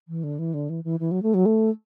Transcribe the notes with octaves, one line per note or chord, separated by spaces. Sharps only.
E3
D3
E3
D3
E3
E3
E3
F#3
A3
F#3
A3